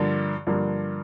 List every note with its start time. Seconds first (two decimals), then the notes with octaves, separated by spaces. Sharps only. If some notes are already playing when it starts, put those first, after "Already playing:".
Already playing: G2 D3 F3 A#3
0.47 G2 D3 F3 A#3